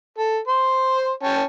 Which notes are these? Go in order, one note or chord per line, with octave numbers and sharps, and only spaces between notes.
A4
C5 C6
C#4 G5 A5